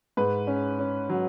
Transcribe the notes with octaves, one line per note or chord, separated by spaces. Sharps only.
G#2 B4
C#4
C#4
F#3